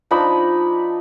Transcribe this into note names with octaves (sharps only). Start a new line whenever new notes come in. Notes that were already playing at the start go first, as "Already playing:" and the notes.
F3 D4 D#4 B5